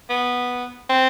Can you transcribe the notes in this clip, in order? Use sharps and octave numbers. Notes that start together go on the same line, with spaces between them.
B3
C4